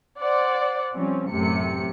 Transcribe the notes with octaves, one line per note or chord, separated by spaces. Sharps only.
C5 D5 F#5
F3 G3 C4 C#4
A1 F#2 C3 A3 C#7